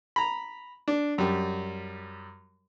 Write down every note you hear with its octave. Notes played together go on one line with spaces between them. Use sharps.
A#5 B5
D4
F#2 G3